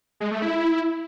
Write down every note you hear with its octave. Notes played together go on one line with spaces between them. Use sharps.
G#3
A3
E4